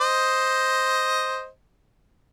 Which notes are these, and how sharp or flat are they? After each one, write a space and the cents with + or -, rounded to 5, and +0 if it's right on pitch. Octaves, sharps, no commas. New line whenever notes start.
C5 +0 D#5 +5